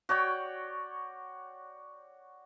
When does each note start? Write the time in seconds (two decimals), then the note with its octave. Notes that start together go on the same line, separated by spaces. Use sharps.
0.09 F#4 C#5 D5 G5